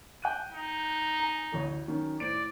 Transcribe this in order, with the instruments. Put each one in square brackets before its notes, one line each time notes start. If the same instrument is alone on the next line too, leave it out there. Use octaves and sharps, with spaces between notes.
[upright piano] G5 F#6 D#7
[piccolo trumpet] D#4
[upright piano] G#5 A#5
A1 D2 C#5
D#3 F#3 C#4
[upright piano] A2 C5 D7 [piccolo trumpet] D5